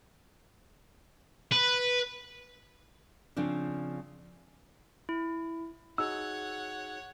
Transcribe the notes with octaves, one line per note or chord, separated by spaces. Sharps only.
B4
C#3 F3 C4 D4
E4
D#4 F#4 G#4 C#5 F#5 E6